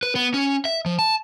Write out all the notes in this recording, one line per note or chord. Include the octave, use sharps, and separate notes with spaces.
B4
B3
C#4
E5
F3
A5